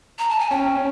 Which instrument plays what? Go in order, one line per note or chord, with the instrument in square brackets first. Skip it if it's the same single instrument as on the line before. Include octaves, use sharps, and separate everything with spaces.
[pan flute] A#5
A5
G#5
[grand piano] C#4 [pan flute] G5
[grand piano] C#4